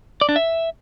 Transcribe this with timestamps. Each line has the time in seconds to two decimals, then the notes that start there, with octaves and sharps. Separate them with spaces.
0.21 D5
0.29 D4
0.36 E5